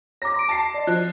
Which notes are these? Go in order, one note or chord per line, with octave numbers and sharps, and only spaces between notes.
C#5 A#5 D6 A#6
C6 D6 D7
A5 C7
D5 D#5
F3 F#6